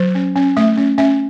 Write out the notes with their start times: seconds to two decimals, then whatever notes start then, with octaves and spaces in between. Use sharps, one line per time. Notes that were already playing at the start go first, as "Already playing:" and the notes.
Already playing: F#3
0.15 C#4
0.36 C#4
0.57 A3 E5
0.77 C#4
0.98 C#4 E5